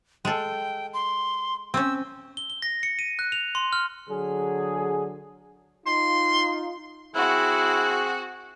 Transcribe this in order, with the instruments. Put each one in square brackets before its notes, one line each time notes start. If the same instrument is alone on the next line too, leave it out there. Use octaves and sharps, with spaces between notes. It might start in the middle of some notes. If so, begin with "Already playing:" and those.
[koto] G#3 A4 [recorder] G5
[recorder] C6
[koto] C4 C#4 [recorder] E6
[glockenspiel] G7
G7
A#6
C#7
D#7
F#6
F7
C6
F6
[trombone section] D3 F#3 G#4
[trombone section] D#4 F4 [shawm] C6
[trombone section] C4 G#4 [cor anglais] E4 [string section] F#4 [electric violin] F#6